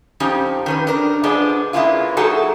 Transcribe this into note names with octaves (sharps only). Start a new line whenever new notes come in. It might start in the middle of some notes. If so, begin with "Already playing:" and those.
F2 F3 C#4 D#4 G4
D#3 C#4 B4
D4 A#4
F3 G#3 B3 D4
G#3 A#3 B3 C#4 E4 F4
F#3 A#3 D#4 F#4 G#4 A4